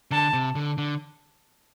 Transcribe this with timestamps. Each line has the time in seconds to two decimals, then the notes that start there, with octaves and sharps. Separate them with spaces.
0.11 D3 A5
0.33 C3
0.55 D3
0.78 D3